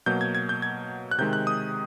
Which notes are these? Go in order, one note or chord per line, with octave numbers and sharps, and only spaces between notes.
B2 F#3 A#3 G6
G#6
G#6
G6
G#6
F#6
C3 D#3 G#3 G6
F#6
D#6